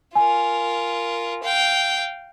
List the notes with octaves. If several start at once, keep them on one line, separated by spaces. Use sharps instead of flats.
F4 A#4 G#5
F5 G5